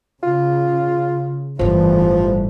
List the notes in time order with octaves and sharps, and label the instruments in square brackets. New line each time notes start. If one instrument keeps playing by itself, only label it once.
[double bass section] C#3 [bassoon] F4
[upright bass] G1 A2 [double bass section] E3 G3 A3 [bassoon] F3